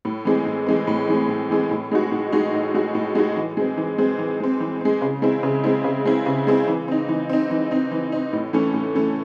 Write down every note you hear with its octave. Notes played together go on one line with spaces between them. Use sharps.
A2
E3 G#3 C4
A2
E3 G#3 C4
A2
E3 G#3 C4
A2
E3 G#3 C4
A2
G#3 D#4 F#4
A2
G#3 D#4 F#4
A2
G#3 D#4 F#4
A2
G#3 D#4 F#4
E3
G#3 C4
E3
G#3 C4
E3
G#3 C4
E3
G#3 C4
C#3
G#3 C4 E4
C#3
G#3 C4 E4
C#3
G#3 C4 E4
C#3
G#3 C4 E4
E3
C4 D#4
E3
C4 D#4
E3
C4 D#4
E3
C4 D#4
A2
E3 A3 C#4
A2
E3 A3 C#4